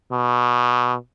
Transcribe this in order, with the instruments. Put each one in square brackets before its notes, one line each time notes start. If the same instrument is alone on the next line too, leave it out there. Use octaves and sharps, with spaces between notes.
[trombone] B2